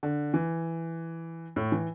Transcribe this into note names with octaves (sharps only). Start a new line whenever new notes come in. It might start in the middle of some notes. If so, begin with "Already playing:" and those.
D3
E3
A2
E3